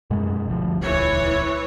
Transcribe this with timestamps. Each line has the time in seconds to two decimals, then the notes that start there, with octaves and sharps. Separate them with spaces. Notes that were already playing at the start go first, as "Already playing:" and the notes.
0.10 F#2 B2 G#3
0.47 G1 D2 F3
0.81 D#1 G#1 C#2 E3 C#5